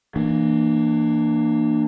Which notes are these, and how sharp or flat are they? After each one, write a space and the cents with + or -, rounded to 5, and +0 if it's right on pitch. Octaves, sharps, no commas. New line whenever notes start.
E3 +0 A#3 +0 D4 +40